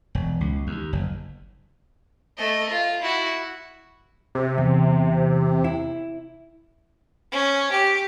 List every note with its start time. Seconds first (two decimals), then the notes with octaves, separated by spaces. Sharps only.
0.15 E1
0.41 C#2
0.67 D#2
0.93 F#1
2.38 A3 D#5
2.69 F4
3.02 E4 F#4
4.35 C3
4.58 E2
5.64 E4
7.32 C#4
7.72 G4